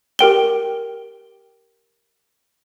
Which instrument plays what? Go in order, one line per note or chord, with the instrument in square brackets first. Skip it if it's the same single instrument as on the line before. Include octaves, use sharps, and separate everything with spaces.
[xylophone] G4 A#4 G5 G7